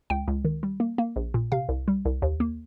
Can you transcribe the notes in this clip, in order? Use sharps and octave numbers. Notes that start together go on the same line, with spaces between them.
C#2 G5
C#2
D#3
G3
A#3
A#3
A#1
A#2
C3 F5
C2
G3
C2
D#2
A#3